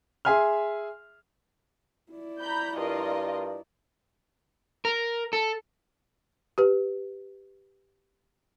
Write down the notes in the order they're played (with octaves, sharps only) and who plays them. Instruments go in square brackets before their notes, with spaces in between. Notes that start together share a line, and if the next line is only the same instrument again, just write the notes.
[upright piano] G#4 E5 G#5 C6 F6
[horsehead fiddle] E4 D5
[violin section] A#5 B5 G6
[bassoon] G2 [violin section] F4 A#4 D#5
[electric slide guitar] A#4
A4
[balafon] G4 B4